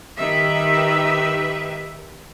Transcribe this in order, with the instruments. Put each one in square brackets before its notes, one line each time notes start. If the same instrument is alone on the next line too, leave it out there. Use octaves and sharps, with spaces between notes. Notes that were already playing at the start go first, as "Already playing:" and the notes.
[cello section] D#3 G4 B4 E5